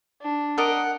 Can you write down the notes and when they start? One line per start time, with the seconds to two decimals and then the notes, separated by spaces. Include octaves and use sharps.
0.22 D4
0.58 A#4 D5 D#5 F#5